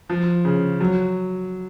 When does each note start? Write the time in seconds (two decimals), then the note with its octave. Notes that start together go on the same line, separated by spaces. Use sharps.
0.09 F3
0.45 C#3
0.80 F#3